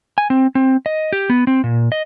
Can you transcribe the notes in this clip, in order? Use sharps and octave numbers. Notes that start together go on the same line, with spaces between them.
G#5
C4
C4
D#5
G4
B3
C4
A#2
D#5